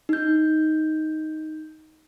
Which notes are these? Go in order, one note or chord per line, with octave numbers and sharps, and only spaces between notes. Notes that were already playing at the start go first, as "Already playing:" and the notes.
D#4 G6